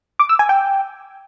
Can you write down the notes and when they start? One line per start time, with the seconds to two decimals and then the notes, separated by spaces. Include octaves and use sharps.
0.19 D6
0.29 E6
0.39 G#5
0.49 G5